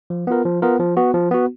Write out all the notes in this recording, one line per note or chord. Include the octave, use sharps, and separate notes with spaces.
F3
B3 F4 A#4
F3
B3 F4 A#4
F3
B3 F#4
F3
B3 F#4